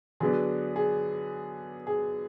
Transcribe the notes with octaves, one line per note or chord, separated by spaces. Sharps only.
D3 F#3 B3 D4 G#4
G#4
G#4